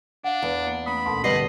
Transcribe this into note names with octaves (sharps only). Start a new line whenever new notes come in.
D4 F5 F#5
E2
A#3
A3 A#3 C#4 B5 D#6
D2 B2 A4 A#4 A5 C6
G#2 D3 G3 B3 D#5 C7 F#7